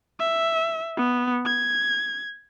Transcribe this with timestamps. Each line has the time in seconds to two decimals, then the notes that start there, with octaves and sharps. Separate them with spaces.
0.19 E5
0.97 B3
1.46 G#6